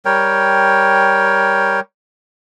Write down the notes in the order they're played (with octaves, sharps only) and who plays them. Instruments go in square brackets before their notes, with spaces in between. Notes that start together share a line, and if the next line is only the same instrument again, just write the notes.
[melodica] G3 A#4 C#5 G5